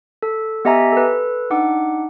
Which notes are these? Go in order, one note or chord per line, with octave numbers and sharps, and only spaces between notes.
A4
B3 G4 D#5 E5 G#5 A#5
A4 B4
D4 D#4 F#5 D6